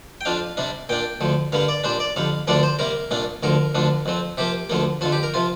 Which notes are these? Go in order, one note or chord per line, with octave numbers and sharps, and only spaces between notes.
G5
F2 F3 D4 F5
C3 G3 D4
A#2 A#3 D4 G5
D2 D3 F3
G2 D3 G3 A#3 F5
D5
A#2 G3 D4 C5
D5
F2 D3 G3 F5
D2 D3 F3 A#3 D4 D5
C5
C3 G3 A#3 A#4
C2 A#2 A#3 D4
D2 D3 F3 A#4
D2 D3 F3 D4
F2 F3 C4
C3 F3 A#3 G4
D2 D3 F3 A#3
F2 D3 F3 F4
G4
A#4
C3 F3 F4